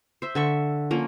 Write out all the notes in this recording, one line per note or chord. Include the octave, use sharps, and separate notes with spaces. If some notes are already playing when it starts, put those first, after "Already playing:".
C5 E5
D3 E5 C#6
F3 A#3 C#4